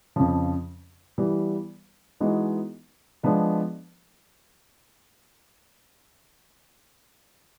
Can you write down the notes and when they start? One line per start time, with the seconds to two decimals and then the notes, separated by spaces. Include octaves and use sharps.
0.16 F2 C#3 F3
1.18 E3 G3 B3
2.20 E3 G#3 B3 D#4 F#4
3.23 F3 G#3 B3 D4